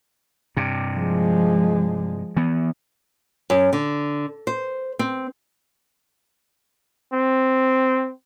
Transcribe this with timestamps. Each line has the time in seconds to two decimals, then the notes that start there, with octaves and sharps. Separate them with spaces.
0.57 G2 C3
0.95 F3 G#3
2.37 E3 B3
3.50 F#2
3.73 D3
4.47 C5
4.99 C4
7.13 C4